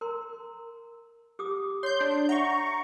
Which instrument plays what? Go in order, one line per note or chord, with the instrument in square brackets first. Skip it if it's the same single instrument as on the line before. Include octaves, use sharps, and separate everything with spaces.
[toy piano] A#4 A#5 C6
G4 D6 D#6
[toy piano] C#5 [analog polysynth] C6 G6
[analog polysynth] D4
[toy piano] E5 F#5 [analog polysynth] A#5 C#6